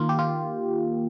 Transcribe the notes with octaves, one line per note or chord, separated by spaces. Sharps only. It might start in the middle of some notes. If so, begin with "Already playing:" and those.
Already playing: D#3 A#3 F4
G4
F4